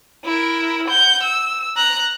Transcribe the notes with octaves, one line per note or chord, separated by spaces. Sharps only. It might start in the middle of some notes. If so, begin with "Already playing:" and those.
E4 A#4
F#5 G6
E6
A#5 F#6